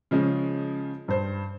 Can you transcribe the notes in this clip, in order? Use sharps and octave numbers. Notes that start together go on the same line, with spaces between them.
C#3 F3 G#3 C#4
G2 C5